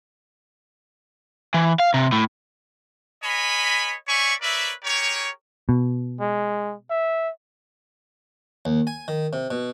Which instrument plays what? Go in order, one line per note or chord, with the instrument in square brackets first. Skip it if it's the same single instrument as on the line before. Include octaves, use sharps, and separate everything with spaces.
[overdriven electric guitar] E3
F5
C3
A2
[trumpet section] A#4 C#5 D#5 G#5 B5
C#5 D5 E5 G#5 B5 C#6
A#4 B4 C#5 D5 E5
G4 G#4 A#4 C#5
[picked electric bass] B2
[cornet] G#3
E5
[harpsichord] D#2
G#5
D#3
C3
B2